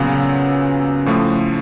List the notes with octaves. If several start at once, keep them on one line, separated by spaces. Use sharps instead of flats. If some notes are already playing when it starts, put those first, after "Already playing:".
Already playing: A#2 C#3 F#3 B3
A2 F3 A3